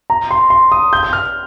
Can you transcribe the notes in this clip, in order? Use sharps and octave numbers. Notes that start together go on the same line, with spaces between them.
A#5
C6
C6
D#6
G6
G6
F6